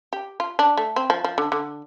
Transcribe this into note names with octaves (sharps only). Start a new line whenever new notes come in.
G4
F4
D4
A3
C4
F3
F3
D3
D3